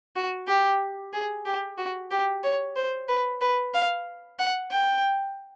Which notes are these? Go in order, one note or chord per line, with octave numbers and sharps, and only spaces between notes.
F#4
G4
G#4
G4
F#4
G4
C#5
C5
B4
B4
F5
F#5
G5